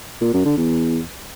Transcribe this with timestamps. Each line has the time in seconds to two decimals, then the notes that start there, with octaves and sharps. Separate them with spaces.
0.21 A#2
0.33 F#2
0.45 D3
0.57 E2